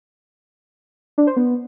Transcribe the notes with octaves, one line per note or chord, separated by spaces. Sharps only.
D4
C5
B3